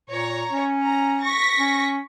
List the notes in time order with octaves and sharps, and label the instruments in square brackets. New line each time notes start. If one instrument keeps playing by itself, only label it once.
[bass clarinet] A#2 [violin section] C#5 A#5
[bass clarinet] C#4
[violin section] A#5
C#6 A#6 B6
[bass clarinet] C#4